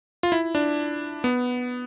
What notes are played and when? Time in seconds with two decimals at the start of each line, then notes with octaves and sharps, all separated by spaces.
0.23 F4
0.32 E4
0.55 D4
1.24 B3